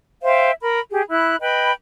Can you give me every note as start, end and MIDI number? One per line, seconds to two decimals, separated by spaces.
0.22 0.51 72
0.22 0.51 76
0.22 0.51 77
0.22 0.51 79
0.61 0.80 70
0.61 0.80 83
0.91 1.02 67
0.91 1.02 68
1.09 1.36 64
1.09 1.36 83
1.09 1.36 90
1.40 1.72 71
1.40 1.72 75
1.40 1.72 79
1.40 1.72 83